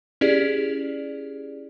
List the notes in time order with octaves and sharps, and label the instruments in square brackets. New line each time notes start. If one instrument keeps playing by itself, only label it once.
[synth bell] C#4 E4 G4 G#4 D5